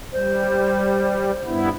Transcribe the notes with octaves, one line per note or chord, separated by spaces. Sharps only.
G3 C5
G2 B3 E4